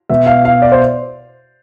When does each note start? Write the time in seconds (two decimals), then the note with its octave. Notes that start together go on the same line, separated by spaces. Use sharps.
0.09 B2 B3 E5
0.26 F5
0.45 F5
0.62 D5
0.72 C5